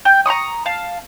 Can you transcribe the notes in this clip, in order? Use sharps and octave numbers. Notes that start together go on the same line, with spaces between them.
G5
A#5 B5 C#6 D#6
F5 A5